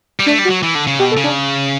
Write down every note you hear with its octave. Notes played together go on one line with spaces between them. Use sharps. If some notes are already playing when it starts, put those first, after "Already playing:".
G3
A3 D4
G3
F#4
F#3
E3
D3
C#3
B2 G4
A4
C#3
D4